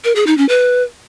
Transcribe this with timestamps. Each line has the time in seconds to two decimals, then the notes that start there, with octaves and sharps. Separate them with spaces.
0.05 A#4
0.16 G#4
0.27 D#4
0.38 C#4
0.49 B4